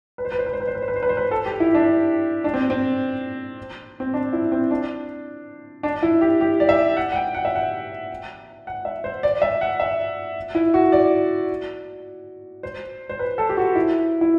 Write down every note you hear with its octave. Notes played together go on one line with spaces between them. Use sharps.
B4
C5
B4
C5
B4
C5
B4
C5
B4
C5
B4
C5
B4
C5
B4
A4
G4
E4
D4
D4
C4
C4
C4
D4
E4
C4
D4
D4
E4
G4
G4
D5
E5
F#5
F#5
G5
F#5
E5
F#5
F#5
E5
C5
D5
E5
F#5
E5
E4
F#4
D5
C5
C5
B4
A4
G4
F#4
E4
E4